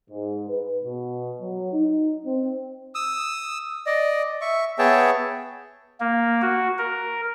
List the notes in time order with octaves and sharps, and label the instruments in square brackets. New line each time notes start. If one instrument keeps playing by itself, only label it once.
[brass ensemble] G#2
B4
B2
F#3
D#4
C4
[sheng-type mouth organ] D#6 E6
D5 D#5
E5 C#6
B3 G#4 C#5 E5 G5 A5
[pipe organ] A#3
F#4
A#4